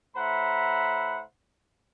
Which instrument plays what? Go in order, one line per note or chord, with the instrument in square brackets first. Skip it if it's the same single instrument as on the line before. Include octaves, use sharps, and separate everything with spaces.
[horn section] A2 C5 E5 F#5 A#5 B5